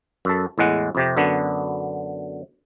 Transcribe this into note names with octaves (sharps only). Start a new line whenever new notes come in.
F#2 A4
E2 A2 G#3 F#5
F2 C3 G4
F#2 D3 B3 D4